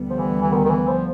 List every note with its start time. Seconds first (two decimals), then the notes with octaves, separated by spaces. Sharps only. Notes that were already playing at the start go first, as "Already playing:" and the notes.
Already playing: D2 D3 G3 B3
0.10 F3
0.18 E3
0.41 E3
0.53 D#3
0.65 D#3
0.70 E3
0.87 F3